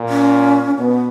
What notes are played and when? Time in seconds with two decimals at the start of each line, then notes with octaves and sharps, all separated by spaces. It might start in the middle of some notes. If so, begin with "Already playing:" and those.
Already playing: A#2
0.09 C#4
0.78 B2 B3